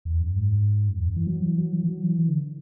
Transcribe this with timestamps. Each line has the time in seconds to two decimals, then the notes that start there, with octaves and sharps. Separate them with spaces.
0.05 E2
0.20 F#2
0.36 G#2
0.89 F#2
0.97 E2
1.07 F#2
1.17 E3
1.27 F#3
1.42 E3
1.58 F#3
1.73 E3
1.84 E3
1.88 F#3
2.03 E3
2.19 E3
2.28 D3